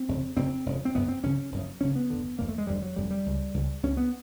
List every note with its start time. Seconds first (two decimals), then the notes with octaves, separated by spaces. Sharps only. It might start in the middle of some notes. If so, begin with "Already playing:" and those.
Already playing: C4
0.08 F1 F2 C#3
0.36 F1 F2 C#3 C4
0.66 F1 F2 C#3
0.85 C4
0.95 F#1 F#2 C#3 B3
1.08 C4
1.23 F#1 F#2 C#3 C#4
1.52 F#1 F#2 C#3
1.81 F#1 F#2 C#3 C#4
1.95 B3
2.10 F1 F2 D3
2.39 F1 F2 D3 A#3
2.48 A3
2.58 G#3
2.67 F1 F2 D3 G3
2.82 F#3
2.96 F1 F2 D3 G3
3.11 G3
3.26 C#2 C#3
3.54 C#2 C#3
3.83 C#2 C#3 C#4
3.97 B3